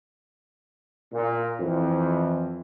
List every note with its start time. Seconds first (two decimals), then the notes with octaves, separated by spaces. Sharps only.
1.13 A#2
1.60 F2 E3